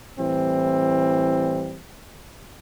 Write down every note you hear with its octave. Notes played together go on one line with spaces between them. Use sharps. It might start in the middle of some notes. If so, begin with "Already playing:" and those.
A2 E3 G3 C4